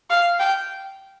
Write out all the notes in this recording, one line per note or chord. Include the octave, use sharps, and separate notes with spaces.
F5
G5